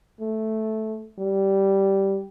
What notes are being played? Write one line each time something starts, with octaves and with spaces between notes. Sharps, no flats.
A3
G3